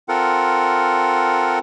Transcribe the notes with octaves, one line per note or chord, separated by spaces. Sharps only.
C4 F4 A4 A#4 F#5